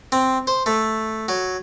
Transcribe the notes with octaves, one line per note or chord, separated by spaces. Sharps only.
C4
C5
A3
F#3